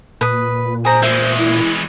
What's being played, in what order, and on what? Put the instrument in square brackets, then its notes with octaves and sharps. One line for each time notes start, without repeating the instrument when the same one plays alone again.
[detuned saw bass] A#2 [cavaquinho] B4 D#6
[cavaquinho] G#4 A#5 [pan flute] C5
[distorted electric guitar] E3 G#3 [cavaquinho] E5
[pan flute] E4